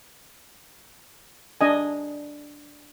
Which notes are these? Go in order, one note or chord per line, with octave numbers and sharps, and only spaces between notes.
D4 D#5 G#5